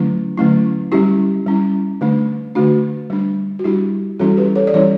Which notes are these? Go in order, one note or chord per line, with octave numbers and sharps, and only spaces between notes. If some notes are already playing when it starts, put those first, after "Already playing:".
Already playing: D3 F#3 A3 C#4 E4
D3 F#3 A3 C#4 E4
G3 C#4 E4 G4
G3 C#4 E4
D3 A3 D4
D3 A3 D4 F#4
G3 D4
F#4
G3 D4 E4 G4
E3 G3 C#4 E4 F#4 A4
G4 B4
A4 C#5
D5
E3 G3 C#4 E4 C#5 E5